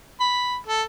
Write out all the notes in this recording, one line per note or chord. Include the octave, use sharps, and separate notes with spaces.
B5
A4